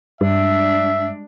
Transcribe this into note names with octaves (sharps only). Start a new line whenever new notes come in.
G2 G3 G#3 D4 E5